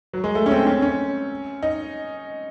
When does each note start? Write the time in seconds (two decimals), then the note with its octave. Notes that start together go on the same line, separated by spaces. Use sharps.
0.13 F#3
0.24 G#3
0.35 A3
0.46 C#4
0.51 C4
0.67 C#4
0.82 C#4
1.63 D#4